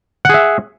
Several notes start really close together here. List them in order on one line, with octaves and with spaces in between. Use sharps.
F#5 G#4 E5